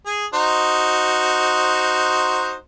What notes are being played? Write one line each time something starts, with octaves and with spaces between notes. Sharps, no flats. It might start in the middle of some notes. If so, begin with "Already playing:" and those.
G#4
D#4 F#4 C5